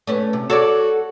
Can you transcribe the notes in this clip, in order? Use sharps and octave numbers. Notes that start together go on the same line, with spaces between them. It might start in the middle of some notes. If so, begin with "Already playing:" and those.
A3 C#4 B4
C3
F#4 A4 C#5 D5